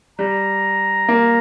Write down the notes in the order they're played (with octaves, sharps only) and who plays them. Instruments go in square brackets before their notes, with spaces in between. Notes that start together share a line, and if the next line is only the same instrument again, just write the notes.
[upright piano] G3 [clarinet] A#5
[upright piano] A#3